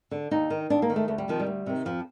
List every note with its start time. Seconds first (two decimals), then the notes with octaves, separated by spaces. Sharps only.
0.11 D3
0.31 D#2 D#4
0.50 D#3
0.70 D#2 D4
0.82 A#3
0.90 D#3
0.96 A3
1.08 D2 A3
1.18 G3
1.28 C3 D#3 F3
1.40 G3
1.47 D2
1.66 C3 D#3
1.85 F2 F3